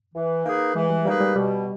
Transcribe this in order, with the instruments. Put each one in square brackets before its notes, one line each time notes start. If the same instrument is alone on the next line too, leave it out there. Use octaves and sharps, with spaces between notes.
[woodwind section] E3
A#3 D#4 G#4 B4
[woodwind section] E3 [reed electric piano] G#3
[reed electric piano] G3
[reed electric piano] G3 [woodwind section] A#3 D#4 G#4 B4
[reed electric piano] G3
[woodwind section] B2 [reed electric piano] G3